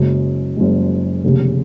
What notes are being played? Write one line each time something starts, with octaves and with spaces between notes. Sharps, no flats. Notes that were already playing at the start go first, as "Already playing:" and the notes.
Already playing: F#1 F#2 C#3 G#3
F#1 F#2 C#3 G#3
F1 D#2 C#3